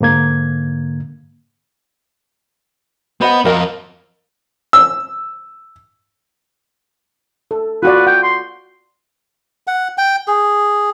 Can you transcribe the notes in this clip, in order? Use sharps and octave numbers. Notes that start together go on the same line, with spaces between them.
G#2 D3 A#3 G#6
B3 C5 D#5 F#5 B5
F2 A#4 D#5 F5
E6
A4
F4 F#4 B4 D5
F#5 G5
C6
F#5
G5
G#4